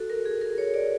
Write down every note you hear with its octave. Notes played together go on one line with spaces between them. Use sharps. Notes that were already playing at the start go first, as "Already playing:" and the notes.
Already playing: F#4 A4
A#4
G#4
A#4
C#5
D5